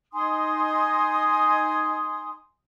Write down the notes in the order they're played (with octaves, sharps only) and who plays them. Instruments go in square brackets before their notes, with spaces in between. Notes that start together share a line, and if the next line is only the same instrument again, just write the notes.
[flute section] D#4 G#5 C6 D#6